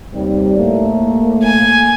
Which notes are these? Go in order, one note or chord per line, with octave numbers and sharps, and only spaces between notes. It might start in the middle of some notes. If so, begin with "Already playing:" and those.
D#2 C3 G3
A2 A3 A#3
G#5